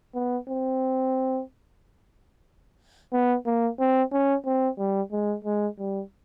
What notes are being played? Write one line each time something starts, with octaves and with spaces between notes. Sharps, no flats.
B3
C4
B3
A#3
C4
C#4
C4
G3
G#3
G#3
G3